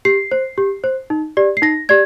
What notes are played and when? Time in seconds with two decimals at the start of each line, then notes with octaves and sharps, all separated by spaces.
0.05 G4 C7
0.31 C5
0.58 G4
0.84 C5
1.10 D#4
1.37 G4 D5
1.57 C7
1.62 D#4 A#6
1.89 G4 D5 G#6